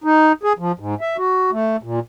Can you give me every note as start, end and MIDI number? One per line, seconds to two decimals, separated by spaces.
0.04 0.32 63
0.43 0.53 68
0.59 0.72 53
0.79 0.95 44
1.01 1.17 76
1.18 1.51 66
1.52 1.77 57
1.83 2.00 46